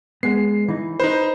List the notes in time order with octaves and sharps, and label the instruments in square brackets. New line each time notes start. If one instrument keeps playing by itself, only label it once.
[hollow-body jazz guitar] G#3 B3 [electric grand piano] C7
[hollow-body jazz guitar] E3 D#4
[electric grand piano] D#4 C5 [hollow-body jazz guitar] B4